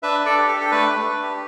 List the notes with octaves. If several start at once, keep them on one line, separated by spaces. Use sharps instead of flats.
D4 B4 E5
D4
A4 D5
G4
A4
D4
A4
A3 B4
A3
D4
G4